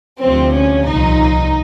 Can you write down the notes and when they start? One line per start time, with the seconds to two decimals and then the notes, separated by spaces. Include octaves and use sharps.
0.20 D2 C3 F3 C4
0.53 C#4
0.85 C2 A#2 F3 D#4